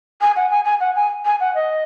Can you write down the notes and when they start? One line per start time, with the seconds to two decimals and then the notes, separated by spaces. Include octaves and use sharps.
0.21 G#5
0.36 F#5
0.50 G#5
0.65 G#5
0.80 F#5
0.95 G#5
1.25 G#5
1.40 F#5
1.55 D#5